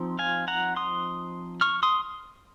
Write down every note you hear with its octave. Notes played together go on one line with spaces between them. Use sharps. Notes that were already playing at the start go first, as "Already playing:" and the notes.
Already playing: F3 C4 D#4
F5 G#5
F#5 A#5
C6 D#6
C#6 F6
C6 D#6